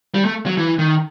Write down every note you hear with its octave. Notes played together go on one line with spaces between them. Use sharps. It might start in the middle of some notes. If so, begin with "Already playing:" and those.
G3
A3
F#3
E3
D#3